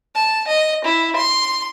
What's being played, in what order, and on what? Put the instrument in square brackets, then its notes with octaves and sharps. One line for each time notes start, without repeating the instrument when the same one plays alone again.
[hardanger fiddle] A5
D#5
E4
C6